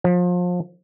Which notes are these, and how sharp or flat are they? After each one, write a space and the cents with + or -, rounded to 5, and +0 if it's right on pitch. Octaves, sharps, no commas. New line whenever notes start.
F3 +30